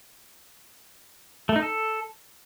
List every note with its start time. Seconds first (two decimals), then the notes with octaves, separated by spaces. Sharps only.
1.49 A3
1.56 D#4
1.62 A4